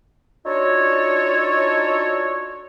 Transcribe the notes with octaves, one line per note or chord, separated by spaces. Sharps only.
D4 D#4 F4 F#4 A4 C#5